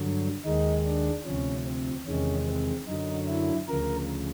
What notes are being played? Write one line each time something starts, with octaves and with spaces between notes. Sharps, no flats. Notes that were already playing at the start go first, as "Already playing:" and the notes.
Already playing: G2 D3 F#3
D#2 D#3 G#3 D#4
D4
D2 C3 F3 C#4
C4
E2 C3 D#3 G#3 C#4
C4
F#2 D3 F#3 D#4
E4
D2 C#3 F3 A#4